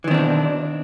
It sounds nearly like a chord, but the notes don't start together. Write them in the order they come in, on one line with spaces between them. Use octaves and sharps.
E3 D#3 C4 D4 B2